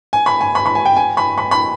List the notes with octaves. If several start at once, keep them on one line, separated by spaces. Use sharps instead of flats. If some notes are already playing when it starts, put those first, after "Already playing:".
G#5
B5
G#5
B5
B5
G#5
G5
G#5
B5
B5
B5